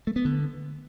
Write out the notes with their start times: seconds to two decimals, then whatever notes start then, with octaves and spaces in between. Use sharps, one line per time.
0.07 A3
0.16 B3
0.25 D3